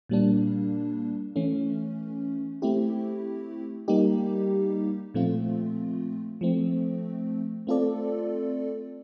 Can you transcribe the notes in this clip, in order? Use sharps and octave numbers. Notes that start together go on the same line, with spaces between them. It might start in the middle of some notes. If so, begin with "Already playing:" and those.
A#2 G3 A#3 D4
E3 A3 C#4
A3 C4 E4 G4
G3 A#3 D#4 G4
A#2 F3 A3 C4 F4
F3 A3 C4
A3 C4 F4 A4 D5